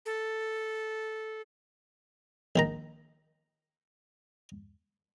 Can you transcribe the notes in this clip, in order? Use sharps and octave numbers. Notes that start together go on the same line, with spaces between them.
A4
A#1 D#3 A#5